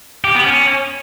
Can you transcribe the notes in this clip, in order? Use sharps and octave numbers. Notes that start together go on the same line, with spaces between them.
G4
B3
C#4